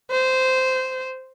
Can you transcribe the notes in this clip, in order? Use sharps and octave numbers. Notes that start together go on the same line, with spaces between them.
C5